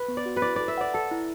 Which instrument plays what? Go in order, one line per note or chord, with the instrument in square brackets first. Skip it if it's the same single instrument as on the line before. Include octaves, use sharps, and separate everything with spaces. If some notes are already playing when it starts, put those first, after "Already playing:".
Already playing: [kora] B4
[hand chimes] B3
[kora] D5
[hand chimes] F#4
[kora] B4
[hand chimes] E4 [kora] D5
[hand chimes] A4 [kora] D5
[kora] E5
[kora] D5 [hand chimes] F#5
[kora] A4 [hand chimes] A5
[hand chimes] E4